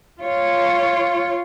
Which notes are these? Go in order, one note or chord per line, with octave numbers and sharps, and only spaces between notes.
F4 C#5